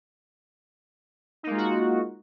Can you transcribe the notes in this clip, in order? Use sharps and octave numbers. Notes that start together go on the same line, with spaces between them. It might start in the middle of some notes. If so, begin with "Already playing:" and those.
G#3 A#3 D#4 F4 F#4